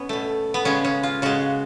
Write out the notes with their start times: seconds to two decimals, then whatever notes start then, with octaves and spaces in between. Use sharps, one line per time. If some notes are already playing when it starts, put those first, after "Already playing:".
Already playing: B3 C#4
0.09 B2 A3
0.54 B3
0.65 C#3 G#3 C#4
0.85 C#4
1.03 F4
1.22 C#3 G#3 F#4